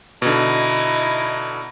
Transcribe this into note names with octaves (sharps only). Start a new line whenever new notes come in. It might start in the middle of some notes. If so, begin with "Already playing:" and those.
B2 D3 D#4 E4